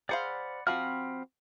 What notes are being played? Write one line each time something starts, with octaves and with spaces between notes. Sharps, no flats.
G#4 C5 D5 F5 F#5 B5
F3 C4 F#4 B5 F6